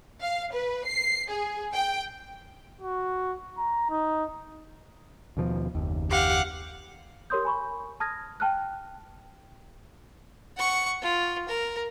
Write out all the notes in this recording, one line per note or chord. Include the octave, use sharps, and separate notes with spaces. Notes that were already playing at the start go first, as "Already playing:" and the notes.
F5
B4
C7
G#4
G5
F#4
A#5
D#4
D#2 B2 F3
F#1 D#2
G4 F5 F#5
G4 A#4 C#5 C6 D#6 G6
G#5 B5 C#6
A5 D#6 F6 G#6 A#6
G5 A5 F6 F#6
F#5 C#6
F4
A#4